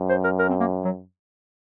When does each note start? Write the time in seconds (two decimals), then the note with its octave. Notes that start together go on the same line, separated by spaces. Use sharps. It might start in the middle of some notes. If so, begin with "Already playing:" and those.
Already playing: F#2
0.10 C5
0.24 A#4
0.39 A#4
0.49 C4
0.60 A#3
0.85 F#3